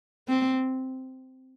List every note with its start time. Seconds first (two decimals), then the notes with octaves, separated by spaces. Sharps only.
0.28 C4